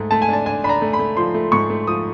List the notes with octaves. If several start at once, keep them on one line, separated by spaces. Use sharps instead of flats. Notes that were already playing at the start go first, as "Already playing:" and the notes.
Already playing: G#2 A3
A3 A5
G#5
D4 A5
D4 G#5
D4 B5
A#5
A3
B5
A3
F3 C6
A3
G#2 C#6
A3
F3 D#6